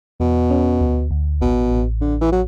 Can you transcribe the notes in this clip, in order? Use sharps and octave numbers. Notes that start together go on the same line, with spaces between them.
E2 B2
C#4
D2
D2
A1 B2
A1
A1 D3
E3
F#3